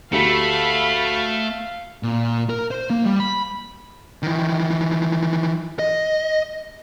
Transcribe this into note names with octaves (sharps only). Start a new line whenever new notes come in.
D2 A3 G4 F5 B5 C#7
A#2
A#4
C5
A#3
G3
B5
D#3 E3
D#5